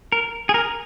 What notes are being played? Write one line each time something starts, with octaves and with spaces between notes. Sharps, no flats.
A#4
G#4
A#4